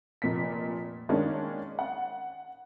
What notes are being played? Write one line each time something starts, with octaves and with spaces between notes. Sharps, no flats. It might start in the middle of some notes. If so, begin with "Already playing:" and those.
F1 A#2 B6
D#3 G#3 A#3 C#4 D4
F#5